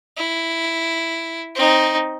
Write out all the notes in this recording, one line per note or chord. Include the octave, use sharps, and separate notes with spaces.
E4
C4 D#4